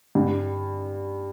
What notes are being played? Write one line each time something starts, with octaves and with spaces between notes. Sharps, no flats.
G2